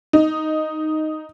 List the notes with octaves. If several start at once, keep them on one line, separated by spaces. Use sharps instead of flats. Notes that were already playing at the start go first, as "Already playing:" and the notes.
D#4